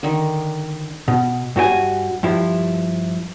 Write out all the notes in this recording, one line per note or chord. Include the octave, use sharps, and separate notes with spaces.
D3 D#3
B2
G2 F#4 A#4 G#5
G2 F3 E4